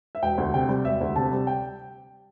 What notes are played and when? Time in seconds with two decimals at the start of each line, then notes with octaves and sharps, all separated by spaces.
0.15 E5
0.22 E1 G5
0.38 D2
0.54 C3 G5
0.69 G3
0.85 E1 E5
1.01 D2
1.16 C3 A5
1.32 G3
1.47 G5